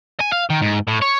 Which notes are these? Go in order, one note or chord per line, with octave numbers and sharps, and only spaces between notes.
G#5
F5
D#3
G#2
A2
C#5